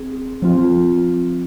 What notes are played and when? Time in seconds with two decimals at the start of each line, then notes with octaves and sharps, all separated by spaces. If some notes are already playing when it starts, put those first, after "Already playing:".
Already playing: C4 G#4
0.42 F3 C4 F4